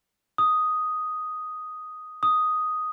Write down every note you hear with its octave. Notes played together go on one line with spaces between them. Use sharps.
D#6
D#6